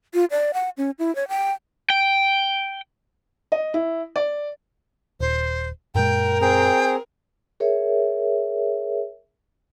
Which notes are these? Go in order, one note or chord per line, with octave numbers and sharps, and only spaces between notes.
F4
D5
F#5
C#4
E4
C#5
G5
G5
D#5
E4
D5
D#1 C5
F#2 A#2 G#3 A#4 G5
C4 G#4 G5
G#4 A#4 C#5 E5